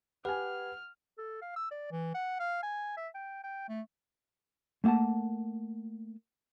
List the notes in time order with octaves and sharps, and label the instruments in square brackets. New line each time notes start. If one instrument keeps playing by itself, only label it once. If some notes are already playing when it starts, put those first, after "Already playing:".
[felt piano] G4 G#5 [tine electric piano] B4 [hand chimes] F#5 [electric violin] F6
[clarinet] A4
F5
E6
D5
E3
F#5
F5
G#5
E5
G5
G5
A3
[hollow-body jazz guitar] A3 A#3 F5 F#5 A5